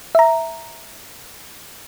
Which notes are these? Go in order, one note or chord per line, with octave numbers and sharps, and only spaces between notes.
E5 A#5